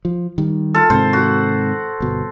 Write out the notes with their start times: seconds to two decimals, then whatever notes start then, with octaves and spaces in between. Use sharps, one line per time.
0.05 F3
0.38 D#3 G3
0.74 F4 A4
0.90 G#2 C3 D#3 C5
1.13 F#4
2.00 G1 B2